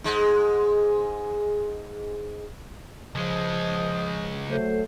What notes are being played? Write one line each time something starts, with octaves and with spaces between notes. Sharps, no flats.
G#2 G#3
C#2 F3 G#3 D#5
F#3 A3 C5